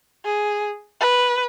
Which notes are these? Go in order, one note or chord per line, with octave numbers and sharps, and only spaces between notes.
G#4
B4